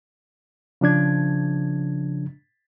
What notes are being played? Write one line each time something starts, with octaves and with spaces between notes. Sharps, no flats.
C#3 F3 D4 G#6